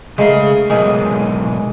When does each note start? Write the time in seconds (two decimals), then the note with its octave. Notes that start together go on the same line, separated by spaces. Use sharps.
0.18 C#3 G#3 A3 A#4 F5
0.70 B1 D#3 G#3